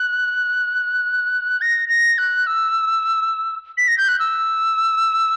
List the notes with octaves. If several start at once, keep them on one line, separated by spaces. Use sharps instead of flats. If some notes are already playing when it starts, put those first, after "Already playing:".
Already playing: F#6
A#6
A#6
F#6
E6
B6
A#6
G6
F#6
E6